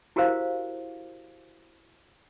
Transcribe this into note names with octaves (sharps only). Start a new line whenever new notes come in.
E4 F#4 G4 A#4 C5 F5